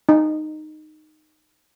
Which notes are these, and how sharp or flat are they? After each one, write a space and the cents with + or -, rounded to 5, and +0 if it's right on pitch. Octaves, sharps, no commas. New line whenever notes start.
D#4 -10